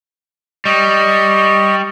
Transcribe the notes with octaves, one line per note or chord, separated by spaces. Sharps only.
G3 D#5 C#6